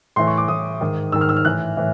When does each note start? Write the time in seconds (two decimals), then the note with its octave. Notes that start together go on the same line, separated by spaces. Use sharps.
0.16 A2 E3 C6
0.27 C#6
0.37 D6
0.48 A2 E3 D#6
0.81 G#2 D#3
1.12 G#2 D#3 E6
1.21 F6
1.29 E6
1.37 F6
1.45 A2 E3 F#6
1.77 A2 E3